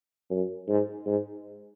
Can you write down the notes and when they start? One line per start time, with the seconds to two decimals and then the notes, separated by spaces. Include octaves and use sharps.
0.31 F#2
0.69 G#2
1.06 G#2